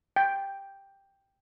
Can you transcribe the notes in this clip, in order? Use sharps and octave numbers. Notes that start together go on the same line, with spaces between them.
G5